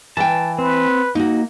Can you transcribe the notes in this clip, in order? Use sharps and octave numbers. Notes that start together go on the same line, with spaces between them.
E3 G5 A5
C4 B4
A#3 D#4 F#4